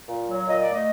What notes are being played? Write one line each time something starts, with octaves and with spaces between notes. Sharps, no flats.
A#2
F#3
A#2 D#5
D5
A3
D#5